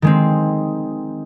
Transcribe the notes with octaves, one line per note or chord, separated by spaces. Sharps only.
D#3 G#3 C4